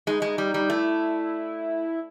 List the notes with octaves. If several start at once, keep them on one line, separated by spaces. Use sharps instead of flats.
G#3 D#4
G#3
G3
G3
A3 E4